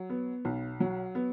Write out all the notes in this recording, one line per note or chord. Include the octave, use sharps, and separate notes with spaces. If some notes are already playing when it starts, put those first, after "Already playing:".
Already playing: F#3
B3
B1
F#3
B3